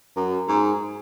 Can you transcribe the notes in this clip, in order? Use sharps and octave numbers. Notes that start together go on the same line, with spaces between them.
F#2
G#2